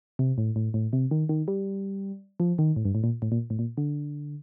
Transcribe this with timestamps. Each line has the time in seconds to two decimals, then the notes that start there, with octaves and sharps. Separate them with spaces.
0.19 C3
0.38 A2
0.56 A2
0.74 A2
0.93 C3
1.11 D#3
1.29 D#3
1.48 G3
2.40 F3
2.59 D#3
2.76 A2
2.85 G2
2.95 A2
3.04 A#2
3.22 A2
3.32 A#2
3.50 A2
3.59 A#2
3.77 D3